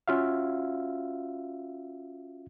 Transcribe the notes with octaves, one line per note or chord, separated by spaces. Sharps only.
C#4 F4 F#4 E5 F5